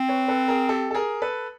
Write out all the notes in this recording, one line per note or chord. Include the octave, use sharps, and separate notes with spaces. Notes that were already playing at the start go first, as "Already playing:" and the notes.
Already playing: C4
B4 C#5
A4 B4
G#4 A#4
G4 A4
A4
G#4 A#4
A4 B4